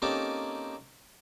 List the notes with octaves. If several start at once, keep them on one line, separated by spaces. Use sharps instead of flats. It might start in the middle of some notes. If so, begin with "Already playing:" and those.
A#3 C4 C#4 D#4 G4 A4